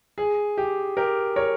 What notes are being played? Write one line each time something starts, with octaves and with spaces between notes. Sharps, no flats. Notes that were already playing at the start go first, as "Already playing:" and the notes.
G#4
G4
G4 A#4
A#4 C#5